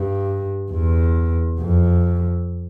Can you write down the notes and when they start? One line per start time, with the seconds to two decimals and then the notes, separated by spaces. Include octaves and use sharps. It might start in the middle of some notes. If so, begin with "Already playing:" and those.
Already playing: G2
0.71 E2
1.60 F2